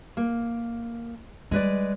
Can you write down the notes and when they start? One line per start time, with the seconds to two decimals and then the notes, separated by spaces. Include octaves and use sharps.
0.17 A#3
1.51 G3 G#3 B4 D5